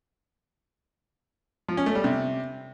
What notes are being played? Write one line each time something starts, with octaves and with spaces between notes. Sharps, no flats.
F3
C#4
A3
G3
C3